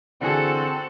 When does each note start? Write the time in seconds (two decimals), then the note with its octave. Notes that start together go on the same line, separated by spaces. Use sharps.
0.21 D3 E3 C4 F#4 G#4 A4